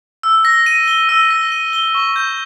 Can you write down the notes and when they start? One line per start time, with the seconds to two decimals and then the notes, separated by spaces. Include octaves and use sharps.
0.23 E6
0.45 A#6
0.66 D#7
0.88 G7
1.09 E6
1.31 A#6
1.52 D#7
1.73 G7
1.95 C#6
2.16 G6